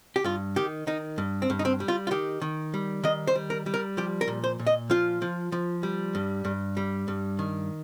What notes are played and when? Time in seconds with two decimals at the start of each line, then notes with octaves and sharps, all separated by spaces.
0.16 G4
0.24 G2 F4
0.56 D#3 G4
0.87 D#3 D#4
1.18 G2
1.42 C4
1.50 G2
1.59 D#4
1.65 C4
1.80 G3
1.88 F4
2.07 F4
2.11 D#3 G4
2.41 D#3
2.74 G3
3.04 D#3 D#5
3.27 C5
3.36 G3
3.50 A#4
3.66 G3
3.74 A#4
3.97 F3 G4
4.21 A#4
4.28 A#2
4.44 C5
4.59 A#2
4.67 D#5
4.90 F3 F4
5.22 F3
5.52 F3
5.83 G3
6.15 G2
6.45 G2
6.77 G3
7.08 G2
7.39 D#3